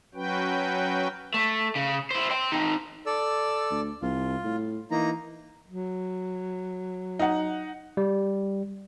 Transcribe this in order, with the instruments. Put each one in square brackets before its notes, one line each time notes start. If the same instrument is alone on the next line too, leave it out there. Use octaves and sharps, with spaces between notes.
[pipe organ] F#3 C#4 F#4 B4 G5
[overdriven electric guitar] A3
C#3
E4 C5
G5 C6
C4 D#4
[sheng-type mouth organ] A4 D5 E6
[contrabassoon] D2
[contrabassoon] C2 [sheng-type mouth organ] F4
[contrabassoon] A2
[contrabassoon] E3 [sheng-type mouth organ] A#3 D#4 A#5
[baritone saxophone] F#3
[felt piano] D#4 F#5
[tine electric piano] G3